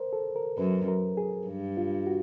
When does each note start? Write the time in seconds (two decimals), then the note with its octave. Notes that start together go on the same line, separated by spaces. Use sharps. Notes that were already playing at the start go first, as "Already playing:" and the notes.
Already playing: A#4 C5
0.13 A4
0.36 A#4
0.58 F#2 B4
0.88 A#4
1.17 G#4
1.47 G2
1.77 F4
2.07 F#4